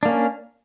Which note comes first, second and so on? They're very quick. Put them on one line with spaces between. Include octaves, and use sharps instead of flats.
D4 A#3 C#4